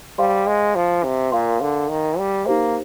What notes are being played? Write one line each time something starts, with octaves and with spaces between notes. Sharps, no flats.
G3 C5 F5 C6
G#3
F3
C3
A#2 A#4 F5 C6
D3
D#3
G3
A#3 D#4 G4 C5